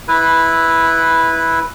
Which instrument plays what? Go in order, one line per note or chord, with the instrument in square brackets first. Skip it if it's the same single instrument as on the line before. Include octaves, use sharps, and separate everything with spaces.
[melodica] E4 B4